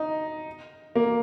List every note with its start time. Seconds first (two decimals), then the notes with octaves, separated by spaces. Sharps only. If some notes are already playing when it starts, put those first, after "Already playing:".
Already playing: D#4
0.96 A#3